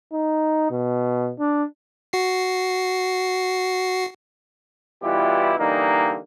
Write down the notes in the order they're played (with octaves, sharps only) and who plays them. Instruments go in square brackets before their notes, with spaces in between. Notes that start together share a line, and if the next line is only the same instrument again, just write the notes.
[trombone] D#4
B2
D4
[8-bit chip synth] F#4 C7
[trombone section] B2 E3 G3 E4 F4 G4
D3 E3 G3 A#3 D#4